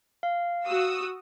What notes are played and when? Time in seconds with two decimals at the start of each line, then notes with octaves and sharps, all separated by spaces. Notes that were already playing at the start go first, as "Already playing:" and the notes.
0.23 F5
0.66 F#4 D#6 E6